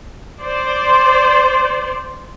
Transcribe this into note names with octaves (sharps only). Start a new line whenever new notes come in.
C5 D5